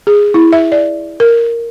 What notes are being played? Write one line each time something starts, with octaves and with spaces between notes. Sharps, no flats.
G#4
E4
E5
D5
A#4